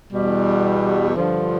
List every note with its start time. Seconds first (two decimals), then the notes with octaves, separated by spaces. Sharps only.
0.12 E2 B2 G3
1.15 G2 D3 F3